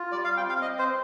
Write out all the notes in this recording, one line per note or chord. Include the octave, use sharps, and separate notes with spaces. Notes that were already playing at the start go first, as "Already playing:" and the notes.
Already playing: F4
G3 D5
F5
C4 G5
F5
C4 D#5
C5
C4